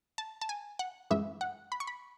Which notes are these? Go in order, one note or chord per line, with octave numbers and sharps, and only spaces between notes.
A5
A5
G#5
F#5
F#2 E3 G#3 E5
F#5
B5
C#6
B5